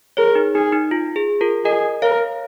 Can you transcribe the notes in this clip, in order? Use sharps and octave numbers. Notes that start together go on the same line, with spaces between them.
G#4 A#4 C#5
D#4
D#4 G#4
D#4
F4
G#4
F4 A#4
G#4 A#4 D#5
A#4 C#5 F5